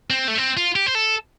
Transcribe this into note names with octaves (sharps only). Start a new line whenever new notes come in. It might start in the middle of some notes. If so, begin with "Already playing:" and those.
C4
A3
C4
F4
G4
C5
A4